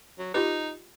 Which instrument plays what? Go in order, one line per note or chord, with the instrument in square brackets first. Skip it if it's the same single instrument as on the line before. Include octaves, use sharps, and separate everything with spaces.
[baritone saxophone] F#3
[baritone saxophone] D#4 [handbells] F4 G4 B4